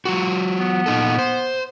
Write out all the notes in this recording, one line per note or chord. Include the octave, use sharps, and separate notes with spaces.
F#3 F4 F#4
B3
A#2 D#4 A4
C5